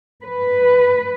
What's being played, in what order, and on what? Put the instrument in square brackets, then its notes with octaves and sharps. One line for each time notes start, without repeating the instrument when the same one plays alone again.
[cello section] B4